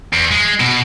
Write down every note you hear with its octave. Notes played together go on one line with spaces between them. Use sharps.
E2
G#3
B2